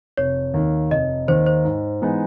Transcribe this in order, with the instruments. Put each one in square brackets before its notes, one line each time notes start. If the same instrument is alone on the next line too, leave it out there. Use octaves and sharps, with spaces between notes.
[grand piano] F1 [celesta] C#5
[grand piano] D#2 D#3
[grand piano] F1 [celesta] D#5
[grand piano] D#2 D#3 [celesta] C5
[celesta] C5
[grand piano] G#2
E3 G#3 B3 D#4